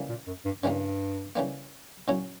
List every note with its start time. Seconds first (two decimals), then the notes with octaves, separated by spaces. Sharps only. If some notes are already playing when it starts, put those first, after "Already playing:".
Already playing: C#3 E3 G3 A#3
0.09 A#2
0.27 F#2
0.45 G2
0.63 G2 C#3 E3 G3 A#3
1.36 C#3 E3 G3 A#3
2.08 A#2 F#3 C#4 E4